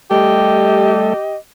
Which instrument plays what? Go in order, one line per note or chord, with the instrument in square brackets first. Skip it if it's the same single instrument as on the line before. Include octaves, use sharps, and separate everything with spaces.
[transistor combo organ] G3 A3 A4 [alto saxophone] G4 [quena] D#5